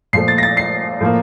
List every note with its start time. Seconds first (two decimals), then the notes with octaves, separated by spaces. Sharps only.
0.13 A#2 F3 A3 C7
0.28 A6
0.38 A#6
0.43 A6
0.57 C7
1.01 A2 F3 A#3